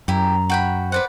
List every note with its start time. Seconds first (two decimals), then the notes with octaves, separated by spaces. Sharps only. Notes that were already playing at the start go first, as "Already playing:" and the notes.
0.08 F#2 E4 G4 A#5
0.50 F#4 G5 B5
0.92 B4 C5 D5 F#5 C6